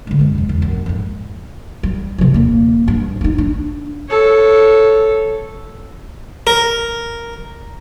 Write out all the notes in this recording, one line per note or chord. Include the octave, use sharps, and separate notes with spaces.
D3 G#3
F#2 G#3
F2 C3
E2
A#1 F#2
F2 G#2
G3
C3 F3
D#1 A#3
G2
C#4 D#4
D4
A4 C#5
A#4